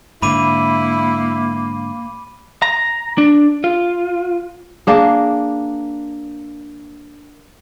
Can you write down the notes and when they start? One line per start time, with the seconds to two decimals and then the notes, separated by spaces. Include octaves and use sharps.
0.22 G#2 D3 A#3 E4 B5 D6 D#7
2.62 A#5
3.18 D4
3.64 F4
4.87 A#3 D4 G#4